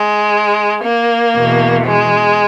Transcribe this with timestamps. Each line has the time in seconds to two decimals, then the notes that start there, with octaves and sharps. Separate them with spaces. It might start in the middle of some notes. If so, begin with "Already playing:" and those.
Already playing: G#3
0.83 A#3
1.35 E2 B2
1.86 G#3